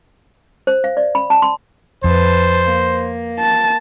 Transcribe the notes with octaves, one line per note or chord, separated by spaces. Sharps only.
C5
F5
D5
B5
A5
C6
F2 B4 C5 A5
A#3
A5